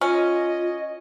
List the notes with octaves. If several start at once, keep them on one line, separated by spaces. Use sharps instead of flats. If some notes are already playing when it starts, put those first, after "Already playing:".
C#4 F4 D#5